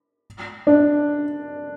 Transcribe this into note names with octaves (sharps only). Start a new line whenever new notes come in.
D4